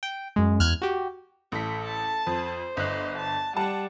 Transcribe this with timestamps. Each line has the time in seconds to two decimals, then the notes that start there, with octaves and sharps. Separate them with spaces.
0.03 G5
0.36 F#2 G#3
0.60 E2 F6 F#6 G#6
0.82 F#4 G4
1.52 A1 A4 B6
1.84 A5
2.27 F2 C5
2.77 G1 D#5 F#6
3.17 A5
3.57 G3 F#5 A5